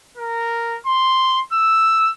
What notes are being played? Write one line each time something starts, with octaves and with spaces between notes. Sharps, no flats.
A#4
C6
E6